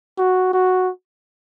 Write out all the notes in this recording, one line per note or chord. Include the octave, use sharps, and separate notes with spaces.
F#4
F#4